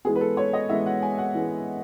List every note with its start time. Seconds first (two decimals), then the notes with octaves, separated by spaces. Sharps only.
0.05 E3 G#3 B3 G#4
0.15 B4
0.21 A4
0.37 C#5
0.53 D#5
0.69 E3 G#3 B3 E5
0.86 F#5
1.03 G#5
1.18 F#5
1.35 E3 G#3 B3